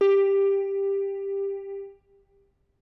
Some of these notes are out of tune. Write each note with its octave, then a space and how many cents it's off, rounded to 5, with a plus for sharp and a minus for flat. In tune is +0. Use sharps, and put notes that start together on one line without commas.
G4 +10